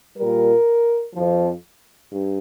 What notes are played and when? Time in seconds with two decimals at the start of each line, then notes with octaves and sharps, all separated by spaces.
0.17 A#2 G3 A#4
1.14 F2 F3
2.10 G2